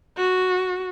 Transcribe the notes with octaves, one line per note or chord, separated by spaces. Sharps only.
F#4